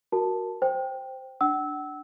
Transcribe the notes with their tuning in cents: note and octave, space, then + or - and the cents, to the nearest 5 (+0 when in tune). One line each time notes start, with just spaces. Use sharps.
F#4 +0 A#4 +0 A5 +0
C5 +0 G5 +0
D4 +0 F#5 +40 E6 -20